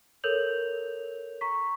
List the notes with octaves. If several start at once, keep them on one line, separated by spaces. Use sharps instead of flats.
A4 A#4 C#5 G6 F7 F#7
A#5 C#6 B6